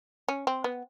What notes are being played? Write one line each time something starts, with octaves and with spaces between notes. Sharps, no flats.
C#4
C4
B3